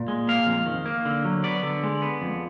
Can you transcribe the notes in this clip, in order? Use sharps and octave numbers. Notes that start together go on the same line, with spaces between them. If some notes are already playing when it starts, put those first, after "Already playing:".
Already playing: A#2
G#3
A#3 F5
F2
D#3
A#3
D3
F#3
B3 D5
D3
G#3
B3
F2